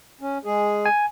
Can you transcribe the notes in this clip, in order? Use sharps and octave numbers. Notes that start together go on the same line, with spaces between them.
C#4
G#3 G#4
G#5